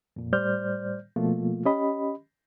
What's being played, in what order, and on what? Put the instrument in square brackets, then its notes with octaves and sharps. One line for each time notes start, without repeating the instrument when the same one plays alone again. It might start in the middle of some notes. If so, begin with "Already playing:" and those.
[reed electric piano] F2 A#2
A2 G3 C5 D5 F6 G6
B2 F3 A3 A#3 F4
C#4 G4 D#5 B5